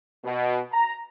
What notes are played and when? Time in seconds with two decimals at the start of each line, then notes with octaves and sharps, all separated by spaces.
0.25 B2
0.72 A#5